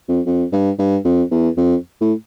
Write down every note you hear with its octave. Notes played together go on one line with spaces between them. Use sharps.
F2
F2
G2
G2
F2
E2
F2
A2